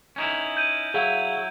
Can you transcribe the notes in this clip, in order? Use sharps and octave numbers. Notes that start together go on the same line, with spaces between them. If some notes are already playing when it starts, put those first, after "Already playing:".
C#4 D#4 E4
G6 D#7
F#3 E4 G#4 F5